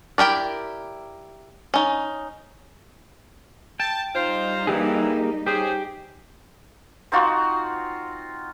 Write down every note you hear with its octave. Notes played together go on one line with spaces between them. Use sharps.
E4 G4 A#4 D5
C#4 D#4
G5 A5
G3 D#4 F4 C5
G2 E3 A#3 G4 G#4
C#4 G4 G#4 C5
C4 D#4 F4 F#4